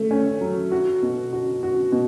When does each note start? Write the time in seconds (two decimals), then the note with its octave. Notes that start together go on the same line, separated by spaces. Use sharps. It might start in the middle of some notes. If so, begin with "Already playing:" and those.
Already playing: A3
0.11 C#4
0.41 F#3
0.72 F#4
1.02 B2
1.33 F#4
1.63 F#4
1.92 B2